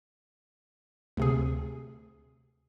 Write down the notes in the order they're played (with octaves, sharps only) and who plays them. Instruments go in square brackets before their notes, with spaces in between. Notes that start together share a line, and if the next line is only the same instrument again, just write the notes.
[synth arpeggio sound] D2 C3 G#4